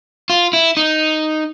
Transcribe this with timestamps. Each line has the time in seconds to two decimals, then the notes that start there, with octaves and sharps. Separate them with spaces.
0.30 F4
0.53 E4
0.77 D#4